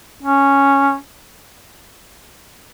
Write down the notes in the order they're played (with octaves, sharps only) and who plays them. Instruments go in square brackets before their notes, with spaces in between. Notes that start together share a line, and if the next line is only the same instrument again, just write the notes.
[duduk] C#4